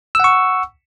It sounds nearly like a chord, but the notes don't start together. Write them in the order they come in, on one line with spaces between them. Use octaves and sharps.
E6 F#5 C#6